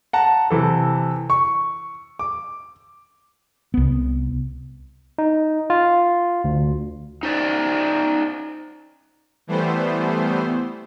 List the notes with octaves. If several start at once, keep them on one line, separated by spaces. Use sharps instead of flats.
F#5 A5 A#5
C3 E3 A4
C#6
D6
C2 B3
D#4
F4
D2
D#4 C5 D5
E3 G3 A3 B3 C5